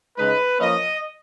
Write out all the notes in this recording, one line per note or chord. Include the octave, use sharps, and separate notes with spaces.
C#3 G#3 D#4 B4
F3 A#3 C#4 D#5